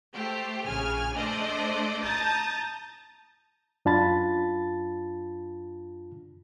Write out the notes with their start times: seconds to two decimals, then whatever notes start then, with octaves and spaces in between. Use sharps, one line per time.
0.13 A3 G4 C5
0.66 A#1 C#3 G#5 F6
1.16 A3 D4 C5 D5 D#5
2.03 A5 A#5 D#6 G6 A6
3.85 F#2 D4 F4 A5 B5 A6